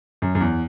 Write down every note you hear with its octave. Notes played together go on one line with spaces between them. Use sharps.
F#2
F#2
E2